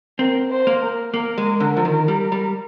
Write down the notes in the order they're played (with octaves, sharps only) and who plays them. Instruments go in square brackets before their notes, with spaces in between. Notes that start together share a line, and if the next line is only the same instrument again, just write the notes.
[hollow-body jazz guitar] C4 [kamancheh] A#4
[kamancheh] C5
[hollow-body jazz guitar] A#3
[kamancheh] A#4
[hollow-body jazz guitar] A#3 [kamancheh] A#4
[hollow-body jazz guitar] G#3
D3
F3
D#3
G3
G3